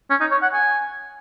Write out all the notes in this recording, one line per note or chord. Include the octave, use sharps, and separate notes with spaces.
C#4
D#4
C#5
F#5
G#5